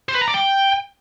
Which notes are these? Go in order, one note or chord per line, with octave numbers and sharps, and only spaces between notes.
C5
B4
A#5
D5
G5